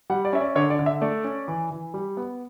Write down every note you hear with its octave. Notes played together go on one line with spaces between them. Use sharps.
G3 F#5
D5
C#4 E5
D5
D3 C#5
D5
D3
E5
A3 D5
C#4
E3
E3
G3
B3